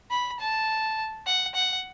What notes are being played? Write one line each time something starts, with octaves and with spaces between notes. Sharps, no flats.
B5
A5
F#5
F#5